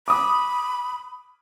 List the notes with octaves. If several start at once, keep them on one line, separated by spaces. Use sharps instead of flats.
B5 D6 D#6